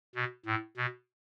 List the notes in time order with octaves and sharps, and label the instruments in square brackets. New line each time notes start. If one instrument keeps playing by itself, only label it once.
[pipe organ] B2
A2
B2